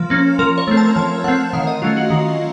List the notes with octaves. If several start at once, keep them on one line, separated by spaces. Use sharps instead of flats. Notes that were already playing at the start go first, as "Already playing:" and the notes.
Already playing: F3 A#3
A#3 C#4
F3 A#4
C#5
A3 C4
A5
F3 A5
A3 C4 F#5
D#3 F5
D#5
F#3 A3 C#4 F4
F#4
D#3 F#4